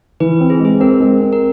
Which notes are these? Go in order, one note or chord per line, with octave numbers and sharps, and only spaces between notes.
E3 B4
C4
G#4
G#3
G#4
C4 A#4
G#3
C4
A#4